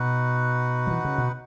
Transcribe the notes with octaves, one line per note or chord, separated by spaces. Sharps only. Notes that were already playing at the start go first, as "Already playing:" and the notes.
Already playing: B2 D#4 F#4 B4 F#5
F#3
E3
C#3
B2